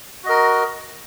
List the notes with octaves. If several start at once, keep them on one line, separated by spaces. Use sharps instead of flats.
F#4 A#4 D#5